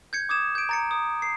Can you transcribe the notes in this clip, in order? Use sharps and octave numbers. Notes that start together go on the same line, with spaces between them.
G6 G#6 C#7
D6 D#6 G#6 E7
G6 D7
A#5 A6 C#7
D#6
C7